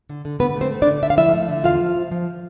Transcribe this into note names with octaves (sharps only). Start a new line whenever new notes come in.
D3
D3
D3 B3 B4
A3 C4 C5
A3
D4 D5
D3
D3 E5
F5
F3 E4 E5
A3
D3
E2 F4 F5
F3
F3
F3